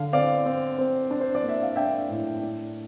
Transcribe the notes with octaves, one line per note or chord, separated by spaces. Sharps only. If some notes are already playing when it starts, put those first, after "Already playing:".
Already playing: D3 F5
C4 D5 F5
C4
C4
D4
C5
D5
A#3
E5
F5
D4 E5 G5
A2
D4